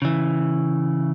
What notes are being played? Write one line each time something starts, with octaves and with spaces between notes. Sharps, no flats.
C#3 E3